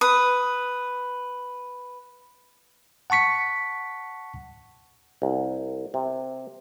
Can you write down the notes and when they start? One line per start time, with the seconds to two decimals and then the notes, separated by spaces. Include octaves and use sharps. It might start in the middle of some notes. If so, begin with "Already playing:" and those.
0.01 B4 D#6
3.10 F#5 A5 C#6 B6 C#7
5.22 C2
5.94 C3